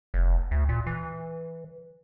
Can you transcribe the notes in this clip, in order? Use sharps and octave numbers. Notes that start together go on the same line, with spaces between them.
F1
D2
A#2
E3